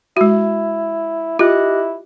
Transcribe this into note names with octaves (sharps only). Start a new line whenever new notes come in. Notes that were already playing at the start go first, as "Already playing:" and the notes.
G#3 E4 F#4
E4 F4 G4 D#5 F#6